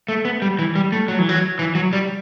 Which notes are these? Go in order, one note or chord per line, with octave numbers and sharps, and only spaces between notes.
A3
B3
G3
E3
G3
A3
F#3
E3
F#3
E3
F#3
G3